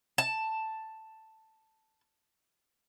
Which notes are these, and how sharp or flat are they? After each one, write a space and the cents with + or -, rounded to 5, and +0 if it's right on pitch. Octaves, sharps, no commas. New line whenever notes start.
A5 +5